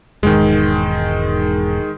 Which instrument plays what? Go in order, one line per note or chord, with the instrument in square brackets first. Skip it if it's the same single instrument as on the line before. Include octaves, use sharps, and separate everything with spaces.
[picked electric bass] E1 G#2 [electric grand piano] D#3 G#3